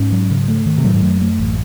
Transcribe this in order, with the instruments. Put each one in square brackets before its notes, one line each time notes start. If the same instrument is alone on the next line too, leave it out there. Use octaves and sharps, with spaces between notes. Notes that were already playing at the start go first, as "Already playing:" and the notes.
Already playing: [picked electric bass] G#2 [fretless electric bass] C#4
[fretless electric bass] F#3
C#3
A3
D#3
[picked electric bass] C3
[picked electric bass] A2 [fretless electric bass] F#3
[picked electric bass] G#2
[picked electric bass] F#2 [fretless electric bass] A3
[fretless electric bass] A3
A1